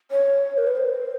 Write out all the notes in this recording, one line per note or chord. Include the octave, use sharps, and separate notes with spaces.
C#5
A#4
B4
C5